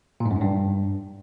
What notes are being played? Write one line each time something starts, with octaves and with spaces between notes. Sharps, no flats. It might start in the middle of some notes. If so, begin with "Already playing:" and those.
A#2
G#2
F#2
G#2
G2